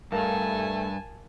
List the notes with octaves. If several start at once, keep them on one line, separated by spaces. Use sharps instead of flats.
G2 A3 A#4 F5 G#5 A5